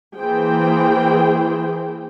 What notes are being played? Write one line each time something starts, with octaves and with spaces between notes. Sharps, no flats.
E3 A#3 G#4 C5 G5